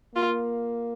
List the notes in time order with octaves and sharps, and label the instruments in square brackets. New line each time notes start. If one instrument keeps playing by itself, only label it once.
[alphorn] A#3 [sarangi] F4